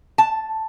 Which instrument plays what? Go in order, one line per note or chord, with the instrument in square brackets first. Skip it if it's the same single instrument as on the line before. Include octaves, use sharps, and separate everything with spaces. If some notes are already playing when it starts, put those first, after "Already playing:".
[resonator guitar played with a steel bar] A5